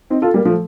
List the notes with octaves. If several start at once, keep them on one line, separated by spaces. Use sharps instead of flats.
C4 D#4
F4 A4
G3 A#3
F3 A3